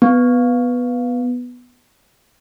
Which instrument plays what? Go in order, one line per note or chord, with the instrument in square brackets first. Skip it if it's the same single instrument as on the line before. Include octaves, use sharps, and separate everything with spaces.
[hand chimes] B3